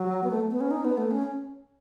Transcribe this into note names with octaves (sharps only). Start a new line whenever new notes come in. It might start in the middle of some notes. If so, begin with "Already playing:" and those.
Already playing: F#3
B3
A3
B3
C#4
D#4
B3
A3
C#4